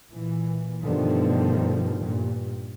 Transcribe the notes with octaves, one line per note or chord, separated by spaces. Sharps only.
A#2 E3
G2 B2 D3 D#3 F3 A3
G2 A#2